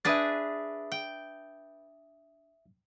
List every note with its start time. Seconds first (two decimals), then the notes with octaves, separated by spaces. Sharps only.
0.05 D4 G#4 B4 E5 D#6 A6
0.92 G5